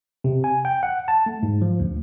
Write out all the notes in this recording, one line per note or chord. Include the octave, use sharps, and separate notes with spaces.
C3
G#5
G5
F#5
A5
A3
G#2
F3
D2